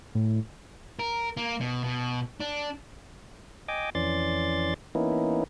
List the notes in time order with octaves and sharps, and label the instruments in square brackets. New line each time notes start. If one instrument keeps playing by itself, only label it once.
[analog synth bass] A2
[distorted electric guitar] A#4
A#3
B2
B2
D4
[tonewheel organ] D#5 G5 G#5 D6
F2 E3 C#4 D5 C6 A6
E3 A#3 B3 C#4 D#4 E4